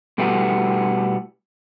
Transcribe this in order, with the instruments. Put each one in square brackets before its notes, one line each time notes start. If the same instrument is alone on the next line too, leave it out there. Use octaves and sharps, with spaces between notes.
[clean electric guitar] B2 G3 A3 B3 E4